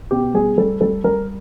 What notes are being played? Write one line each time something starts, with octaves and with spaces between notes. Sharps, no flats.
B2 G4
G3 G#4
G3 A4
G3 A4
G3 A#4